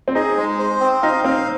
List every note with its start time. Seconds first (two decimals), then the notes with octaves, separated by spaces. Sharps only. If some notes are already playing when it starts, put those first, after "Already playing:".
0.08 C4
0.15 D#4 G#4
0.37 G#3
0.59 C5
0.80 C4
1.02 D#4 F5
1.24 C4 F5